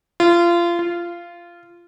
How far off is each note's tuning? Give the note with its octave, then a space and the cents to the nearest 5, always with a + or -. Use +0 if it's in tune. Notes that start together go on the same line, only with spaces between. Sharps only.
F4 -25
F4 -15